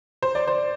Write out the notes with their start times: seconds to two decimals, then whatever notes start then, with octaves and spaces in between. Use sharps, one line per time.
0.22 C5
0.35 D5
0.47 C5